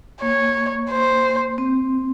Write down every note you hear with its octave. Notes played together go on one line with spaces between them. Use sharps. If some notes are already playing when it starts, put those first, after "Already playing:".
A#3 C#5
C5
C4